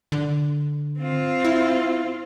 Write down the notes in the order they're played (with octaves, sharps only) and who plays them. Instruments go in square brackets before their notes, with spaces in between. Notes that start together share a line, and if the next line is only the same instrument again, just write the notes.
[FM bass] D3
[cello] C4 F4
[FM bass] E4